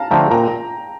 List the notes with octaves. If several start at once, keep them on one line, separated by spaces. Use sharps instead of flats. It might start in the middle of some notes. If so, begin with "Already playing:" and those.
Already playing: F5 A5 A#5
D3 F3 A3 G5 A#5
A#2 G5 A#5